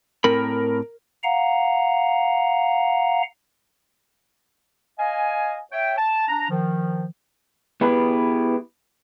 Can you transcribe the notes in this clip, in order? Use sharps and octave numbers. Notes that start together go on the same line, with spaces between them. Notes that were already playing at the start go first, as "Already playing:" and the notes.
A2 C4 A#4 B5
F5 F#5 A#5
D#5 F5 G#5
C#5 E5 G5
A5
D4 A#5
D#3 F3
B3 E4 G4 G#4 B4